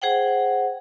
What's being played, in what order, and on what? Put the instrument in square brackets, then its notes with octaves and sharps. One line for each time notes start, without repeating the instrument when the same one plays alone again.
[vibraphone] G#4 C5 F#5 G5